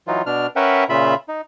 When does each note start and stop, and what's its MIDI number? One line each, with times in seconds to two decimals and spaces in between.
0.07 0.22 52
0.07 0.22 54
0.07 0.22 63
0.07 0.22 65
0.26 0.47 47
0.26 0.47 62
0.26 0.47 89
0.56 0.84 61
0.56 0.84 70
0.56 0.84 71
0.56 0.84 76
0.56 0.84 78
0.56 0.84 79
0.89 1.15 46
0.89 1.15 49
0.89 1.15 65
0.89 1.15 76
0.89 1.15 83
1.28 1.41 63